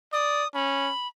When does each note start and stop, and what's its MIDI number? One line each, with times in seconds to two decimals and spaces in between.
0.13 0.44 74
0.13 0.48 87
0.54 0.91 61
0.54 1.07 83